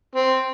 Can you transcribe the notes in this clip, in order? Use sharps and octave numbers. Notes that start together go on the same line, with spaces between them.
C4